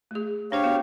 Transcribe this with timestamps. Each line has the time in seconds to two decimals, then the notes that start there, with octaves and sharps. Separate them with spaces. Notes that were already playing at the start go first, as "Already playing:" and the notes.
0.11 A3 G#4
0.52 D4 G4 C5 C#5 F5 G5
0.64 B3 F#4